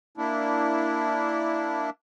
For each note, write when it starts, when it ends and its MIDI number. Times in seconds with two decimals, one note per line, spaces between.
0.17 1.90 58
0.17 1.90 62
0.17 1.90 64